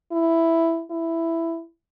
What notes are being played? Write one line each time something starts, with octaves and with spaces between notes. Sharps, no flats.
E4
E4